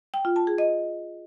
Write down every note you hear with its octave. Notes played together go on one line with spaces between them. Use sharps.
G5
F4
A5
G#4
D#5